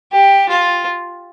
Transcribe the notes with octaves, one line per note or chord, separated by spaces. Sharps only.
G4
F4